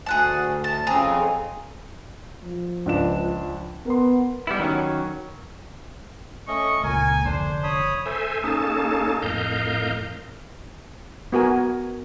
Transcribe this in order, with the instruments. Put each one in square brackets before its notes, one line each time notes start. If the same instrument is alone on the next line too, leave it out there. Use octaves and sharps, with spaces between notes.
[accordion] D2 [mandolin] G#4 F#5 A5
[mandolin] A5
[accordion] F2 C#3 C4 [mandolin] G#4 A#5
[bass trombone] F3
[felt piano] C#2 D4 E7
[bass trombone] B3 [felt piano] A#4 C6
[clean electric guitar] G3 B3 E4
D#3 F#3 C#4
[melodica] A3 C#4 D#5 [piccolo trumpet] C#6
[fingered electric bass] C#2 A#2 [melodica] A#4 [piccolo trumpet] G#5
[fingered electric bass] F1 D3 [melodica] D4 [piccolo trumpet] C5
[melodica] C#5 B5 D#6
[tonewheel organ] A4 C5 E5 G#5
A#3 C#4 D#4 G#4 A4 A5
F2 A2 A#4 D#5 F5 G6
[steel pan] B3 F#4 A#4 G#5